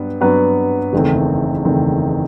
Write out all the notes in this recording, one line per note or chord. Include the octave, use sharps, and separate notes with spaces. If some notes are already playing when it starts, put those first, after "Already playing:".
Already playing: G2 F#3 B3 B4
G2 F#3 B3 F#4 B4
F#1 E2 D#3 A3 C4
F#1 E2 D#3 A3 C4